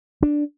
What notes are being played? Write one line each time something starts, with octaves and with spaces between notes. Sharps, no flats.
D4